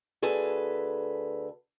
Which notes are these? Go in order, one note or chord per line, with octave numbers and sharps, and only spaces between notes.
D2 G#4 A4 B4